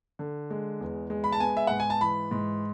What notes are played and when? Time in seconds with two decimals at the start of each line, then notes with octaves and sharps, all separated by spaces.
0.19 D3
0.51 G#3
0.81 E2
1.10 G#3
1.24 B5
1.32 A5
1.40 B3 G#5
1.57 E5
1.67 G#2 F#5
1.80 G#5
1.90 A5
2.01 E3 B5
2.31 G#2